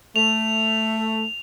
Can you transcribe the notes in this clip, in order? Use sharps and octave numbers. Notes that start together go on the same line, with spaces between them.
A3 F7